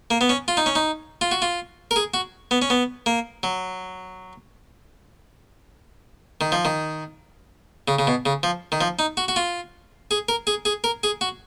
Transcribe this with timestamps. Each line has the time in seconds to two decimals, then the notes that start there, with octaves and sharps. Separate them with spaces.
0.11 A#3
0.21 B3
0.29 C#4
0.48 F4
0.57 D#4
0.66 C#4
0.75 D#4
1.21 F4
1.31 F#4
1.42 F4
1.91 A#4
1.96 G#4
2.14 F#4
2.51 B3
2.62 C#4
2.70 B3
3.06 A#3
3.43 F#3
6.41 D#3
6.52 F3
6.65 D#3
7.88 C#3
7.99 C#3
8.07 B2
8.26 C#3
8.43 F3
8.72 D#3
8.81 F3
8.99 D#4
9.17 F#4
9.28 F#4
9.36 F4
10.11 G#4
10.29 A#4
10.47 G#4
10.65 G#4
10.84 A#4
11.03 G#4
11.21 F#4